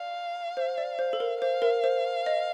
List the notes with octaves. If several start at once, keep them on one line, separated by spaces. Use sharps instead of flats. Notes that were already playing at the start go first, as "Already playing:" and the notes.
Already playing: D5 F5
C5
D5
C5
A4
A#4
C5 F5
A#4
C5
D#5